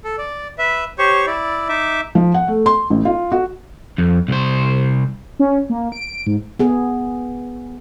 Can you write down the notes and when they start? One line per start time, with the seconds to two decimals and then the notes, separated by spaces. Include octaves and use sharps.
0.04 A4
0.18 D5
0.58 B4 E5
0.99 G4 C5 C#5 C#6
1.26 E4 D5
1.69 D#4 E5 D6
2.15 F3
2.34 F#5
2.48 A3
2.66 C6
2.90 A1
3.05 F4
3.32 F#4
3.98 F2
4.28 C2 C5
5.39 C#4
5.70 A#3
5.92 D7
6.27 G#2
6.59 B3 G#4